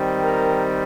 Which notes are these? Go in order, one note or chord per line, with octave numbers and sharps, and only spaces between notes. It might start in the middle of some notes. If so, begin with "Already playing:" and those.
Already playing: D#3 G3 C4
A#4